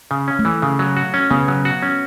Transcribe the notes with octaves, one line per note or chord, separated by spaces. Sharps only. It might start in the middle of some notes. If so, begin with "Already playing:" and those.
C#3
C#4
A3
E3
C#3
F#3
F#4
C#4
C#3 B3
F#3
F#4
C#4